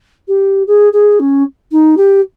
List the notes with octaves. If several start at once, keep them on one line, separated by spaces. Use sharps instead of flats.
G4
G#4
G#4
C#4
D#4
G4